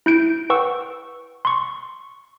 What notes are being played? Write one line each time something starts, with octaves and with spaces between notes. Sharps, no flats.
E4 G6 D7
B4 F#5 G5 C#6 E6
C6 C#6